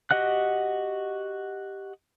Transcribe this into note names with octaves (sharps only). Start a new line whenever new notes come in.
F#4 G4 D#5 F#5 F#6